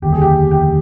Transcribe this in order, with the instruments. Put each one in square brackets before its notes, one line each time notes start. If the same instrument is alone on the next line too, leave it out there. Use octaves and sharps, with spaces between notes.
[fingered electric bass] F1 D#2 D3 G3 [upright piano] G4
[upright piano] G#4
G4
G4